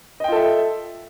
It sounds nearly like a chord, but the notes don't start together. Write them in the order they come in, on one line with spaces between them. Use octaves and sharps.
D#5 G5 F4 A4 E5